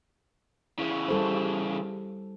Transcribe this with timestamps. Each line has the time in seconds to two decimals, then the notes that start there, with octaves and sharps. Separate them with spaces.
0.78 C#3 E3 E4
1.08 G3 A4 C5